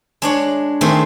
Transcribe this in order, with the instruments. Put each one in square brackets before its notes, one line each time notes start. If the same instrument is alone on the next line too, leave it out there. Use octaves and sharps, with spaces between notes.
[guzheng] G#3 D4 C#5
D#3 G#3 A3 C4